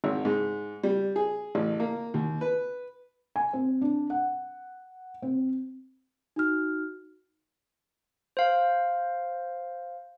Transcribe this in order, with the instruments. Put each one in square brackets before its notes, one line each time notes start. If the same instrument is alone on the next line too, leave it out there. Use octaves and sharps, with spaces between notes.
[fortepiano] G#1
G#2
G3
G#4
A1
A#3
D#2
B4
[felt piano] G#5
C4
D4
F#5
C4
[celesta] D#4 F#4 F6
[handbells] C5 F5